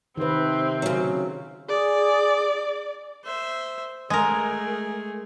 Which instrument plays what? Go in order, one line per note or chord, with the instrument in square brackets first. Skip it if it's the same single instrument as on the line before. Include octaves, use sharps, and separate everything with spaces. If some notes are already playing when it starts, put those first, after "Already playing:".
[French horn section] C3 [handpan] D#3 B4 [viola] C4
[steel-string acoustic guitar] C#3 F#3
[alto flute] G#4 [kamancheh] D5
[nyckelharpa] C5 E5
[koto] G#3 A#4 [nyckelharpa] A3 G#4